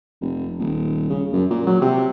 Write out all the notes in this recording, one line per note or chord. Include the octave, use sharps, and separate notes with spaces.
F1
D#1
C#3
F#2
A#2
F#3
C3